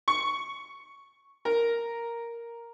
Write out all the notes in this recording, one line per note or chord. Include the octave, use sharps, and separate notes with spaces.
C#6
A#4